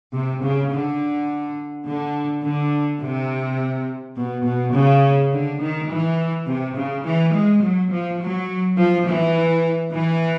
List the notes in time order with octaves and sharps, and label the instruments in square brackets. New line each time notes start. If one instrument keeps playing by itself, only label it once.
[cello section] C3
C#3
D3
D3
D3
C3
B2
B2
C#3
D3
D#3
E3
C3
C#3
E3
G#3
F#3
F3
F#3
F3
E3
E3